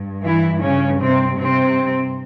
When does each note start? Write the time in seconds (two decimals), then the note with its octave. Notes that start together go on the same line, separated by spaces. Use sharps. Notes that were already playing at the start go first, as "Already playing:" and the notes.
Already playing: G2
0.24 E3 E4
0.62 C#3 C#4
0.99 C3 C4
1.37 C3 C4